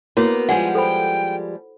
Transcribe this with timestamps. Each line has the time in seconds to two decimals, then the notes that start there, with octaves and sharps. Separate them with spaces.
0.17 A#3 B3 E4 F#4 C#5
0.49 F3 G3 G#3 F#5 G#5
0.75 A4 C5 G5 B5